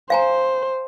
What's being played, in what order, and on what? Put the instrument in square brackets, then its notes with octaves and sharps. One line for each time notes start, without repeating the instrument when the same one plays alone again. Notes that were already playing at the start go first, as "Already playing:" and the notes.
[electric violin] C5 [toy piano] F5 G#5 A#5